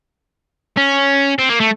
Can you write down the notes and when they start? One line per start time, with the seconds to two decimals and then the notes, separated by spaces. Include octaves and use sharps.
0.77 C#4
1.39 C4
1.49 A#3
1.60 A3